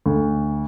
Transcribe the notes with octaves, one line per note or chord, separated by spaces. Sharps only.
D2